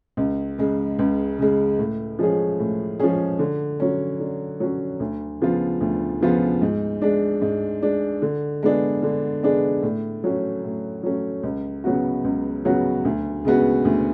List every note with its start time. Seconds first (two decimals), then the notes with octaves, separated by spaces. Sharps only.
0.17 C#2
0.58 C#3 G#3
0.99 C#2
1.39 C#3 G#3
1.78 A2
2.19 F3 G#3 C#4 G#4
2.60 A2
2.99 F3 G#3 C#4 G#4
3.39 D3
3.80 F#3 C#4
4.20 D3
4.60 F#3 C#4
5.00 D2
5.41 C#3 F3 B3 F4
5.81 D2
6.20 C#3 F3 B3 F4
6.61 G#2
7.02 G#3 D4
7.42 G#2
7.82 G#3 D4
8.22 D3
8.63 G#3 B3 D4 G#4
9.03 D3
9.43 G#3 B3 D4 G#4
9.83 A2
10.24 F#3 A3 C#4
10.64 A2
11.03 F#3 A3 C#4
11.43 C#2
11.84 C#3 F#3 B3 F#4
12.24 C#2
12.65 C#3 F#3 B3 F#4
13.05 D2
13.45 C#3 G#3 B3 F#4
13.85 D2